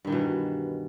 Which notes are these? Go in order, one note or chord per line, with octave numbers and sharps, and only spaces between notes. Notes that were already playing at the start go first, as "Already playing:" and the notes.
G2 B2 D#3 E3